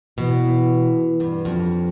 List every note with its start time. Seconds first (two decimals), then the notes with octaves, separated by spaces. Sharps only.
0.18 B2 E3
1.20 G2
1.45 F2